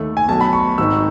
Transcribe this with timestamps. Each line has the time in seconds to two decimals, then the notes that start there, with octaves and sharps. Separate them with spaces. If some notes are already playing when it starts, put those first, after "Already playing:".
Already playing: D#2 D#3 A3
0.17 G#5
0.28 B1 B2 A3 A5
0.41 B5
0.53 C#6
0.78 G#1 G#2 D#3 E6